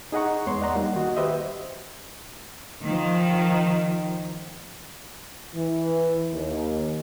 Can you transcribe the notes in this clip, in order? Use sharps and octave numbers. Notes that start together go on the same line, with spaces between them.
D#4 G#4 D#5 F#5 A#5 C#6
E2 G#3 B3 C#5 C6
D5 D#5 F#5 A#5 C6
G3 A#3 D#4 F#5
D#3 F#4 D#5
F#4 G4 B4 C5 D#5 E5
D#3 F3
E3
D#2